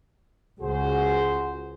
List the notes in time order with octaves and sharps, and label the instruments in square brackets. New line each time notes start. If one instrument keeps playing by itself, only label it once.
[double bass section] C#2 [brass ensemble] F#4 G#4 C5